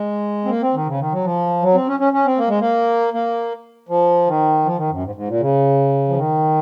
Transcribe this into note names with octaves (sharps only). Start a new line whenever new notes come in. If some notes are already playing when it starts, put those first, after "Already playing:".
Already playing: G#3
C4
A#3
C4
D#3
C#3
D#3
F#3
F3
F#3
C4
C#4
C#4
C#4
C4
A#3
G#3
A#3
A#3
F3
D#3
F3
D#3
F#2
G#2
G#2
A#2
C#3
F3
D#3